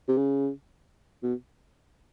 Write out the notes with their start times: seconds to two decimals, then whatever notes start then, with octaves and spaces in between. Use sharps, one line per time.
0.08 C3
0.17 C#3
1.23 B2